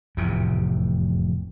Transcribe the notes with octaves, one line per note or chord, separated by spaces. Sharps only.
F1 E2 A2 C3